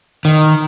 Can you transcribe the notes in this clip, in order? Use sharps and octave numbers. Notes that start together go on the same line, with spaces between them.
D#3